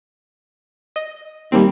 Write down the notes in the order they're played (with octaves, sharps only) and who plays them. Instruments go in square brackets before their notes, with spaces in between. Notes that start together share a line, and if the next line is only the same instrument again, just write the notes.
[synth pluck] D#5
[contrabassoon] D#2 [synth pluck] G3 A#3 C4